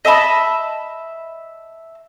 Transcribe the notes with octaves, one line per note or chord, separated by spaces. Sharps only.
D#5 E5 A5 B5